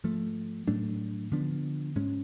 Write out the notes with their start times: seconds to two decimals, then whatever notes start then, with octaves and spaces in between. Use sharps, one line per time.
0.04 G#2 F3 A3
0.67 A2 F#3 A3 D4
1.31 D3 F3 B3 D4
1.96 G#2 G#3 C#4